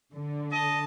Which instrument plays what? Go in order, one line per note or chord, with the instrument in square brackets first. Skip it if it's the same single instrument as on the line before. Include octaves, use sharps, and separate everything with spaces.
[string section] D3
[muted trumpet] D#5 [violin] A5